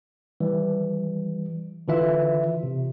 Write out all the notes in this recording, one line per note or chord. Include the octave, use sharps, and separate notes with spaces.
E3 G3
D3 E3 F4 E5
C3